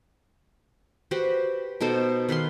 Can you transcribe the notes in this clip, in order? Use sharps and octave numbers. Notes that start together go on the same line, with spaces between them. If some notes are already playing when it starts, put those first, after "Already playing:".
F#4 G4 B4 C5
B2 D#4 A4 C5
D#3 B4 F5 C6